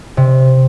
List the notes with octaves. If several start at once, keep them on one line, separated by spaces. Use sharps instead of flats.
C3